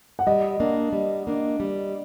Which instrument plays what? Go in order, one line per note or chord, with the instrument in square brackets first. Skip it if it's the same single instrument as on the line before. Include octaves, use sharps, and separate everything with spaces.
[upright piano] F#5
[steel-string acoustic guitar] G3 [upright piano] D#5
[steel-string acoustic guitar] A#3 D4
G3
A#3 D4
G3